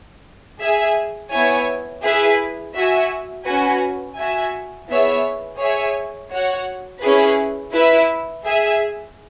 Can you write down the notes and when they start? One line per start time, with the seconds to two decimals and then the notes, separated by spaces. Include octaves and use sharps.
0.59 G#4 E5 G#5
1.31 B3 E4 C#5 G#5
2.03 E4 G#4 B4 E5 G#5
2.74 F#4 E5 G#5
3.44 C#4 F#4 B4 G#5
4.16 F#4 E5 G#5
4.88 B3 E4 G#4 C#5 E5
5.59 G#4 C#5 E5 G#5
6.30 F#4 C#5 F#5
7.01 C#4 E4 G#4 B4
7.73 E4 B4 E5
8.45 G#4 E5 G#5